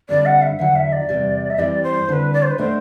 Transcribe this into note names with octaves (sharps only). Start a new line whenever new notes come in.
G2 D3 G3 C4 D5
F#5
E5
E2 D3 F#3 F#5
E5
D5
E2 C3 G3
E5
G2 E3 G3 C4 D5
C5
D3 G3 C4 B4 C5
D5
C5
B4
B2 A3 D4 C5